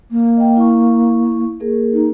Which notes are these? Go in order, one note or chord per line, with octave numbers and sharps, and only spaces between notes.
A#3
D#5 G5
E4 C#6
A#3 G#4 A#4
D#4